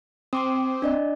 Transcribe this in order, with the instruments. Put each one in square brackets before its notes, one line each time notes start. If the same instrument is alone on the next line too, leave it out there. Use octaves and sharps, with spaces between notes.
[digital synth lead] C4 [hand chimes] C6 D6 D#6
[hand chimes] D4 D5 D#5